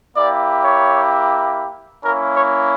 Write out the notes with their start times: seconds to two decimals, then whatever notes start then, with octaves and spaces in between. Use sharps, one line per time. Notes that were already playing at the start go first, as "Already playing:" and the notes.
0.17 A#3 E4 G4 D5
0.64 C#5
2.05 A#3 C#4 E4 A#4
2.37 C#5